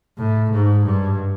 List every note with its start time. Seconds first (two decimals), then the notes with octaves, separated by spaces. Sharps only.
0.18 A2
0.52 G#2
0.86 G2